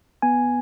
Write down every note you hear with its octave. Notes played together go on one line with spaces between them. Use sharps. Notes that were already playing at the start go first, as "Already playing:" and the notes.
B3 G#5